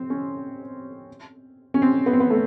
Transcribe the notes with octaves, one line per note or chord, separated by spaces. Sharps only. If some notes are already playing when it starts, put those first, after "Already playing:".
Already playing: C4
C#4
C#4
C4
B3
C4
B3
A3